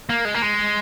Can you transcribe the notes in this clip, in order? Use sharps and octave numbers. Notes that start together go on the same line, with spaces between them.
A#3
G#3
A#3
G#3